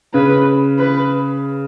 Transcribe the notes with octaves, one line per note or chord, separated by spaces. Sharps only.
C#3 B4
B4